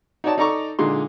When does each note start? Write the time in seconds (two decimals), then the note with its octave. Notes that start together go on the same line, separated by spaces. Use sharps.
0.24 D#4 F#4 C#5 D5 A5
0.38 D#4 A4 D5 A#5 C#6 D6
0.79 A#2 D3 G#3 D#4 C6